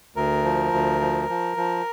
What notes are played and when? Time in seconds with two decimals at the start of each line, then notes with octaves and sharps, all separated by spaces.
0.16 D2 A#4
0.44 F3
0.73 D2
1.01 F3
1.29 F3
1.57 F3